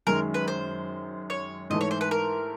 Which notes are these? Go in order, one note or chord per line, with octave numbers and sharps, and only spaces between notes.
F#2 D#3 G#3 A#4
B4
C5
C#5
G#2 E3 A3 D#5
C#5
C5
B4
A#4